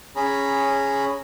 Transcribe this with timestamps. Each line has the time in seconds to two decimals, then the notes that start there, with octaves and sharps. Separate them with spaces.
0.16 C#4 G#4 A#5 B5